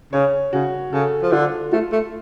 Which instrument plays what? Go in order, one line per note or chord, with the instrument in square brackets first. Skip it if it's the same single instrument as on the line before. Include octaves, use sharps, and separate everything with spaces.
[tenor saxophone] C#3 [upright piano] C#5
[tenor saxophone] C#3 [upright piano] F#4
[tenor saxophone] C#3 [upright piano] A4
[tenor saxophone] F3
[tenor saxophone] D3 [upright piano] F4
[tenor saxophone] A3 [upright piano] F4
[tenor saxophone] A3